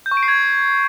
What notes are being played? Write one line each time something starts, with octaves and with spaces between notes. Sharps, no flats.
G6
C#6
D7
C7
G#6